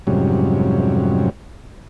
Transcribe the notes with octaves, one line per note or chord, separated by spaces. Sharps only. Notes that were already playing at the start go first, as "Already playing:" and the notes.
F2 G#2 C3 F#3 G3 C#4